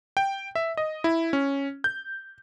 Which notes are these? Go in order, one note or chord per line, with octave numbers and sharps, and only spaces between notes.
G5
E5
D#5
E4
C#4
G6